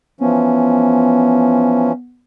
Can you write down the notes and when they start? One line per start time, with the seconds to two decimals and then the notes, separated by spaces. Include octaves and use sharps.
0.21 E3 F3 B3 C#4